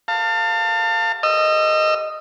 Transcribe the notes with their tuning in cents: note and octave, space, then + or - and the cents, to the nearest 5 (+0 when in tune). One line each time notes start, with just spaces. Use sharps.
F5 +0 A5 +35
D#5 +0 E6 +40